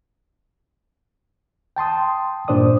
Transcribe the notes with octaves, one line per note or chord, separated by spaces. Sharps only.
G5 A5 C6 D#6
G2 A#2 D4 C5 D5 D#6